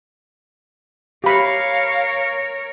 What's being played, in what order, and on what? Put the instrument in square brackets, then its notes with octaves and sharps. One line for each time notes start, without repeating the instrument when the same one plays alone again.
[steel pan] G4 B5 [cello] A#4 C#5 [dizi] F5